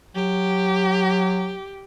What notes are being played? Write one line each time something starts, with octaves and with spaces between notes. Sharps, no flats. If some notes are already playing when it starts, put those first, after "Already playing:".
F#3 G4